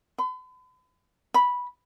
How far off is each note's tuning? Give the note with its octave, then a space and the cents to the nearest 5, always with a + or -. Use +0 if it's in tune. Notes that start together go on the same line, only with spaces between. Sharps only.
B5 +45
B5 -10